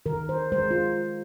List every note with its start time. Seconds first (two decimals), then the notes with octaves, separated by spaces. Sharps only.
0.06 D#3 A#4
0.29 C5
0.52 G#3 C5
0.71 F4